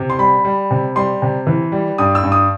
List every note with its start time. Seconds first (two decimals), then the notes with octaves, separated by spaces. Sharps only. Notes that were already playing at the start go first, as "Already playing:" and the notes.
Already playing: C3
0.10 C6
0.19 G3 B5
0.45 G3
0.71 C3
0.96 G3 C6
1.22 C3
1.47 E3
1.72 G3
1.98 G2 D#6
2.15 E6
2.24 G2
2.32 D#6